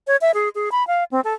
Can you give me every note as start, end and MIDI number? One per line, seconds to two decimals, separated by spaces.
0.07 0.16 73
0.21 0.31 76
0.34 0.49 68
0.55 0.69 68
0.72 0.86 83
0.87 1.04 77
1.11 1.20 60
1.24 1.34 69